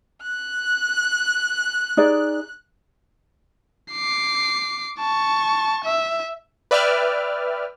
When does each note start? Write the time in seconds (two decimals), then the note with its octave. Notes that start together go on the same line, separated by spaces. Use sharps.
0.23 F#6
1.97 D#4 G#4 D5
3.92 D6 C7
5.00 A5 C#6
5.85 E5
6.71 B4 D5 E5 G5 F6